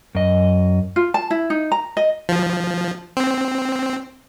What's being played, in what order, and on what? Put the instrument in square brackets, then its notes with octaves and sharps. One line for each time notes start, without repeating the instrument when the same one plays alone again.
[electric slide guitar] F#2 D#5
[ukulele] F4
A5
E4
D#4
A#5
D#5
[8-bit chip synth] F3
C4